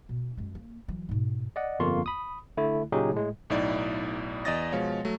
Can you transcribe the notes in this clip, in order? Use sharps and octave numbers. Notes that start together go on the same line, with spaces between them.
B2
F#2 G#3
A#3
E3 F#3
G#2 B2
D5 D#5 F#5
G1 F2 A#3 F4 C6 C#6
B5 D#6
D3 A3 E4
A#2 C#3 F#3 D#4 G4 G#4
A2 G#3
B1 A2 D#4 E4 D5
E2 D5 D#5 D#6 A6 A#6
B2 F3 G#3 C#5 F5
F#3 A3